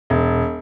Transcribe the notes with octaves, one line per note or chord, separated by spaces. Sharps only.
E1